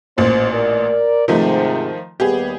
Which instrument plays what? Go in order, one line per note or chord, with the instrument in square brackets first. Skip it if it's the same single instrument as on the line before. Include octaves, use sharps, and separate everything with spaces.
[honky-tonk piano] A1 A#2 [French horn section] C#4 C5
[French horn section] A#4 D5
[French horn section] G#2 C3 [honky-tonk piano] D#3 F3 A3
[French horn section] D#2 G3 B3 [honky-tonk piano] G4 G#4